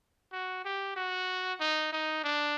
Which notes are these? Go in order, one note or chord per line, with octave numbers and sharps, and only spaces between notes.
F#4
G4
F#4
D#4
D#4
D4